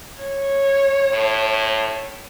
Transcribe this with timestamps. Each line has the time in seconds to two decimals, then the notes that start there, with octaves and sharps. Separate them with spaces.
0.21 C#5
1.12 A2